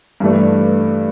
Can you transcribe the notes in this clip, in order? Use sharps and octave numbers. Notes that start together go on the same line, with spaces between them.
G2 E3 A3 D4